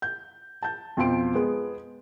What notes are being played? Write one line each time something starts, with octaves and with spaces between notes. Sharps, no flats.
G6
A5 G6
F2 B2 F3 C6 D7
G#3 B3